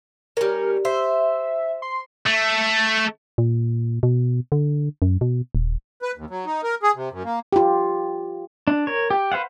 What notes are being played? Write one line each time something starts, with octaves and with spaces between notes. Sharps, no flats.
G3 C#4 A#4
C5 E5
C6
A3
A#2
B2
D3
F#2
B2
D#1
B4
D#2
F#3
D#4
A#4
G#4
C3
F#2
A#3
F4 G4
D4
A#4 C#5
G4
B4 C5 F5 F#5